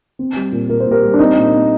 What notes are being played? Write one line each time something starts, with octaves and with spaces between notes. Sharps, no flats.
C4
G3
A#2
A#2 A#4
C5
A#2 G4 A#4
G3
D4
C4 D#4
A#2
C4